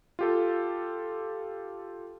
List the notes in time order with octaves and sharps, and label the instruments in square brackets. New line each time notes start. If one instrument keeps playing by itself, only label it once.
[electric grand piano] F4 G4 A4